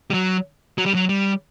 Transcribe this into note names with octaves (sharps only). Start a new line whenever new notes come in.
G3
F#3
F#3
G3
F#3
G3